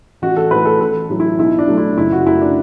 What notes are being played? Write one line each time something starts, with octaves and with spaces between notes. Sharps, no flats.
A1 F#4
A4
A2 A3 B4
A4
A1 A4
A2 F#3
E4
B1 E4
D4
A2 F#3 A3
E4
F#1 E4
F#4
F#2 F#3 A3 E4
D4